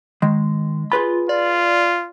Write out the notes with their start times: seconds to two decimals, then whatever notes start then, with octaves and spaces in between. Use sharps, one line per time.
0.22 D#3 G#3
0.92 F4 G#4 B4 B5
1.29 F4 D5